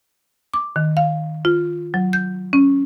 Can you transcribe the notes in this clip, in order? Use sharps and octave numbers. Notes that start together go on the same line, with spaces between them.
D6
D#3
F5
F4
F#3
G6
C#4